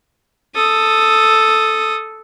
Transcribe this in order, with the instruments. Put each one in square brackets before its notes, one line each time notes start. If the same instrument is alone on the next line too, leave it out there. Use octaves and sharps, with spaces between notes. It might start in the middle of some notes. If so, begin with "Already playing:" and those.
[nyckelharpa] A4 D#6